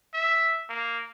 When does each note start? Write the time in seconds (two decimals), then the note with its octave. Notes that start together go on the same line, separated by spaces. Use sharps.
0.14 E5
0.69 A#3